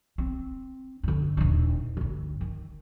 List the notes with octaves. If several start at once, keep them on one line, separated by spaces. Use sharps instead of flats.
C4
G2 D3
D#1 D4
D2 G2
D#3